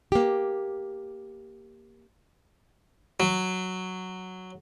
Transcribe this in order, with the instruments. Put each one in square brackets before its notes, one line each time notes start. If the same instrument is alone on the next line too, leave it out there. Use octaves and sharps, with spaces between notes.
[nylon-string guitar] A#3 G4
[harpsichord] F#3